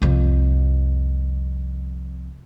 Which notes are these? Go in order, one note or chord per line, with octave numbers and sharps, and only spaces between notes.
C2 F2